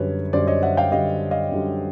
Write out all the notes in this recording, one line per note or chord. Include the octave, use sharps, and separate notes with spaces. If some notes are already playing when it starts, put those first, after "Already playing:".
Already playing: F#2 D3 G3 B4 C#5
F#2 D3 G3 C5 D5
C#5 D#5
E5 F#5
F5 G5
F#2 D3 G3 D#5 F5
D#5 F5
F#2 D3 G3